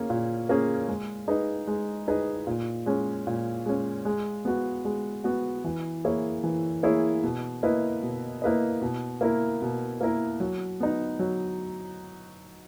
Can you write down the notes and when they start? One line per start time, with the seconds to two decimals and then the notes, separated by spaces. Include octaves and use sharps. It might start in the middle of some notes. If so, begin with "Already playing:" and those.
Already playing: A#3 C#4 G#4
0.10 A#2
0.49 A#3 C#4 G#4
0.88 G#3
1.28 D#4 G#4 B4 D#5
1.67 G#3
2.08 D#4 G#4 B4 D#5
2.47 A#2
2.86 G#3 C#4
3.27 A#2
3.66 G#3 C#4
4.05 G#3
4.45 B3 F#4
4.85 G#3
5.24 B3 F#4
5.64 E3
6.04 A#3 E4 G#4 C#5
6.44 E3
6.83 A#3 E4 G#4 C#5
7.23 B2
7.63 A#3 E4 B4 D#5
8.03 B2
8.42 A#3 E4 B4 D#5
8.82 B2
9.21 A#3 E4 A#4
9.62 B2
10.01 A#3 E4 A#4
10.40 F#3
10.80 B3 D#4
11.19 F#3